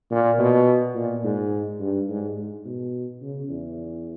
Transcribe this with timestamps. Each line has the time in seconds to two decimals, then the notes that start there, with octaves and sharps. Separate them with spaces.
0.11 A#2
0.39 B2
0.95 A#2
1.24 G#2
1.80 G2
2.08 G#2
2.37 G#2
2.65 B2
3.22 C#3
3.50 E2